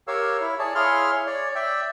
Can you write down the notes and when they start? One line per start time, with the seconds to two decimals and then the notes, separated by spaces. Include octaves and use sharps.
0.08 G4 A#4 C#5 F5 E6
0.41 E4
0.59 G#4 C#5 D5 A5
0.75 E4 G#4 C#5 F5 C6 F6
1.27 C#5 D5
1.55 D5 E5 G5